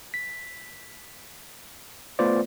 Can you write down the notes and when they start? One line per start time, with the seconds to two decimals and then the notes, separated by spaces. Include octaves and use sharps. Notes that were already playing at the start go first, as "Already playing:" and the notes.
0.14 B6
2.19 A3 B3 F4 B4 C5 D5